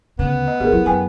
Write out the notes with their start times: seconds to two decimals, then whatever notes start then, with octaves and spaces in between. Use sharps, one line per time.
0.19 D2 C#3 B3
0.48 D#5
0.60 G1 G4 G#4 A#4
0.72 C2 F#3 E4
0.86 F#2 F#3 B4 G5 G#5